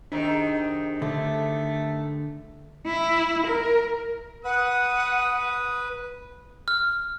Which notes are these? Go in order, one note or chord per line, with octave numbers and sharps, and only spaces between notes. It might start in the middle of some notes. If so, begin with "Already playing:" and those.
G#2 C3 D#3 D4
D3 A3
E4
A#4
B4 F#5 D#6
F6